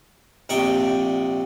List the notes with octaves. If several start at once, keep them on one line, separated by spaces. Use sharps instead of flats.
A#1 C3 D5 D#5 G5 C#6